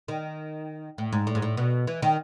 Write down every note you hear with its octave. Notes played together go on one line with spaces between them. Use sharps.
D#3
A2
G#2
A2
G#2
A2
B2
E3
D#3